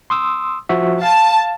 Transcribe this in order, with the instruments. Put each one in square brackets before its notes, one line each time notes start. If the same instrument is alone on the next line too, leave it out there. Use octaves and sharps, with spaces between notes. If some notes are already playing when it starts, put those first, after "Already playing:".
[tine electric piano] C6 D#6 E6
F3 F#4 E5
[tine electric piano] F5 [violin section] A5